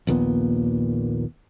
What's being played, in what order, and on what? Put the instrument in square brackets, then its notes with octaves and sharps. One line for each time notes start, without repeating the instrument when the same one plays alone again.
[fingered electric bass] A#1 D#2 A#2 B3